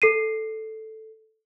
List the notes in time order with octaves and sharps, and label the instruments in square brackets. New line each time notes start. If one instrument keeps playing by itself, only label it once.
[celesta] A4 C7 D#7